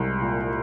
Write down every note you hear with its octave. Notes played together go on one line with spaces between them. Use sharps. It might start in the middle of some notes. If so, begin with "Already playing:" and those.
Already playing: C2 G#3
A#2